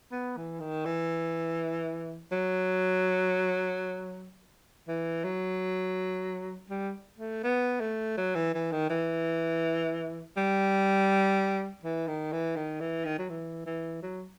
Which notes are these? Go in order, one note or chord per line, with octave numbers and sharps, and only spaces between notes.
B3
E3
D#3
E3
F#3
E3
F#3
G3
A3
B3
A3
F#3
E3
E3
D#3
E3
G3
E3
D#3
E3
D#3
E3
D#3
F#3
E3
E3
F#3